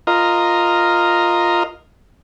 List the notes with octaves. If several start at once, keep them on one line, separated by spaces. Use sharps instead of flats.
F4 A#4 D#5